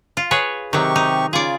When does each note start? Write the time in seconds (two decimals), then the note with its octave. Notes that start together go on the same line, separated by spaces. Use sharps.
0.17 F4
0.31 G#4 B4 C#5
0.73 C3 D#3 F#3 G4 C#6
0.96 D#4
1.33 C#3 F4 G#4 D5